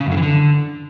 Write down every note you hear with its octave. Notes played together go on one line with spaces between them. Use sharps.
C#3
F#2
D3
E3
D3